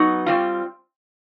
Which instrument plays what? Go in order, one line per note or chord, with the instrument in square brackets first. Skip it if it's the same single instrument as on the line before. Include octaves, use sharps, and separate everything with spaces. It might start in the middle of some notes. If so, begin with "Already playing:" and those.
Already playing: [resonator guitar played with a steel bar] F#3 B3 D#4
G3 C4 F4